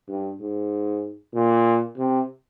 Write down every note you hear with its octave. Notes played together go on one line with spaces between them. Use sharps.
G2
G#2
A#2
C3